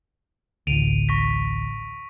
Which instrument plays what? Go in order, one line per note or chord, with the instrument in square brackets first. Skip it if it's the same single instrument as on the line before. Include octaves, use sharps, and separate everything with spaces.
[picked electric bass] A1 D2 [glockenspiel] D7 D#7 F7
[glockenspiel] C#6 A#6 B6